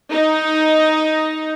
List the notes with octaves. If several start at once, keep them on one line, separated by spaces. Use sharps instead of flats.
D#4